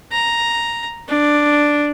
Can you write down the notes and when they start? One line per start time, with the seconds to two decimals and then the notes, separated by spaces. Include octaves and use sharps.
0.12 A#5
1.09 D4